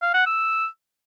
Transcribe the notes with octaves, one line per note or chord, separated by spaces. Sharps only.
F5
F#5
E6